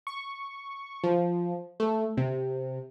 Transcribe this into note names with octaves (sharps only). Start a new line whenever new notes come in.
C#6
F3
A3
C3